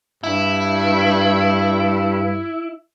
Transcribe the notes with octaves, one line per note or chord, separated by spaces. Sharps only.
G2 E4